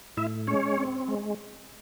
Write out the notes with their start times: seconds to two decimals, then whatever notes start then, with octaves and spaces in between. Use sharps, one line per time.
0.17 A2 E4 E5
0.47 G#3 C#4 C#5
0.77 C4
1.08 G#3